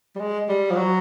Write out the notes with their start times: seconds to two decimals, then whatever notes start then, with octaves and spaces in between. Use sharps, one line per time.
0.16 G3
0.19 G#3
0.49 G3
0.70 F3
0.76 F#3